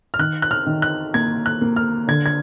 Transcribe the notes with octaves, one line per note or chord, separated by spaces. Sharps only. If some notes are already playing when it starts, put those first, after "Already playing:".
F6
D#3 F#6
F#6
F6
D#3
F#6
A#3 G#6
F#6
A#3
F6
D3 G#6
G#6